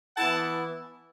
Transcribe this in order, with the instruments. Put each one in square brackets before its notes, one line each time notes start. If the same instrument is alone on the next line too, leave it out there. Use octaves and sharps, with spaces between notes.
[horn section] E3 B3 E4 F#5 A5